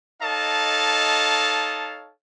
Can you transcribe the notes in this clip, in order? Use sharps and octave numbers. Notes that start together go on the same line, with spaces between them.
D#4 A4 C#5 D#5 F5 A5